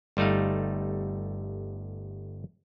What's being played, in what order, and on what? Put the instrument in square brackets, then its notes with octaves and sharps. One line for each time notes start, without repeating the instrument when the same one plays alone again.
[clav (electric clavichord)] G1 G3 A3 D#4 F5